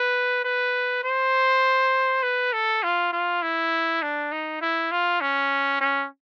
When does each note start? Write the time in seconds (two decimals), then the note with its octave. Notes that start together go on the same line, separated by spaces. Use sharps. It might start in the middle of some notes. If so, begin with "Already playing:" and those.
Already playing: B4
0.44 B4
1.04 C5
2.23 B4
2.53 A4
2.83 F4
3.13 F4
3.42 E4
4.02 D4
4.32 D#4
4.61 E4
4.91 F4
5.21 C#4
5.81 C#4